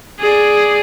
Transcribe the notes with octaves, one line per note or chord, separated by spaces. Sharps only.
G#4 D5